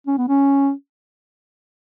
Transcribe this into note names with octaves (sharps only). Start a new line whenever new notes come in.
C#4
B3
C#4